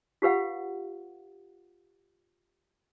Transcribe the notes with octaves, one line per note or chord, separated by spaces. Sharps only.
F4 G4 B4 F5 F#5